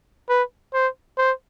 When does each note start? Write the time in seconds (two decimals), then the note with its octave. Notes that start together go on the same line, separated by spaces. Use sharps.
0.29 B4
0.74 C5
1.18 C5